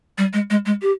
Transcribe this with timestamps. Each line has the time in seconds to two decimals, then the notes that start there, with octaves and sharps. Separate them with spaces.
0.18 G3
0.33 G#3
0.50 G#3
0.66 G#3
0.82 G4